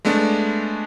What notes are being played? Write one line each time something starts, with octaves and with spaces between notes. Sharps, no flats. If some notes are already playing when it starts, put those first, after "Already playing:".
G#3 A3 B3 D4